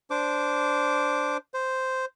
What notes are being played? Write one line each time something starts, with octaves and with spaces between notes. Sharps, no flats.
D4 C5 D6
C5